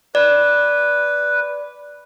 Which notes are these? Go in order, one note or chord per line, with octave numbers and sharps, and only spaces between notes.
B4 D5